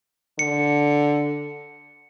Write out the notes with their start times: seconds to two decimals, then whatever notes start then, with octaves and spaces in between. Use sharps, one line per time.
0.39 D3 C#7